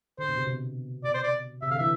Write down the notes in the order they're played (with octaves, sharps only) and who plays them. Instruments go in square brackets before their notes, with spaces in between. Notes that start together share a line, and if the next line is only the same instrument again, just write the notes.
[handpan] D3 [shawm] C5
[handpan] B2
C3
B2
[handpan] B2 [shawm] D5
[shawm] C5
D5
[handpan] C3 [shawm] E5
[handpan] D3 [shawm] F5
[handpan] E3 [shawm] E5